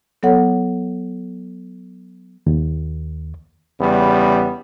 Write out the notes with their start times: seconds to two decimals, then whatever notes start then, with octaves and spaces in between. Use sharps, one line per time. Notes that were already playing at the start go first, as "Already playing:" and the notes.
0.23 F#3 B3 A4 C#5 F#5
2.47 D#2
3.79 E2 C#3 G3 B3